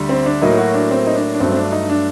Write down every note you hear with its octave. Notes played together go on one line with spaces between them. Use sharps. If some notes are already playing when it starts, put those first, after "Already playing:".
Already playing: D2 D3 G3
C4
D4
A2 F#3 A#3 D#4
F#4
D4
C4
D#4
D4
D4
G2 F#3 A3 C4
C4
D4
D#4
D4